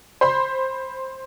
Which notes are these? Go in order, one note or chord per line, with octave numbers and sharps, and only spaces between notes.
C5 B5 C6